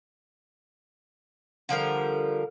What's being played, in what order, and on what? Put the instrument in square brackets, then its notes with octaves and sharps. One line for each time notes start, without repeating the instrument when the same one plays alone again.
[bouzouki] D3 F3 G3 A#4